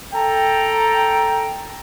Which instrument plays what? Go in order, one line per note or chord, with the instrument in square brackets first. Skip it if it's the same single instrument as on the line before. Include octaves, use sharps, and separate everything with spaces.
[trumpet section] A4 G5 A#5